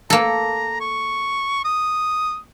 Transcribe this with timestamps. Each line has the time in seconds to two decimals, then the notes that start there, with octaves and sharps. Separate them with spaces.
0.10 A#3 A4 A#5
0.81 C#6
1.65 D#6